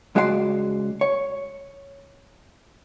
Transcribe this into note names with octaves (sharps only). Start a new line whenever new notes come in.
C#2 G#3 F#4 D5 E5 C6
C#5